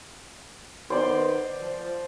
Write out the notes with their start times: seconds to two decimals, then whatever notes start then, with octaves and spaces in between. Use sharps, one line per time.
0.90 D#3 B3 C5 D5 C6
1.61 F3